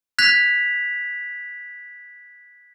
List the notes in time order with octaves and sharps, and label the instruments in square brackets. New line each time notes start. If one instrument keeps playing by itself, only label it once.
[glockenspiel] F#6 G#6 B6 F7